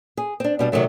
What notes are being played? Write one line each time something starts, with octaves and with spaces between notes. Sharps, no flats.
G#4
C4 D4
B2 G3 D4
C3 D#3 F#3 A3